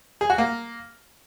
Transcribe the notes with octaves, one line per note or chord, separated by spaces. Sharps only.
G#4
F#4
A#3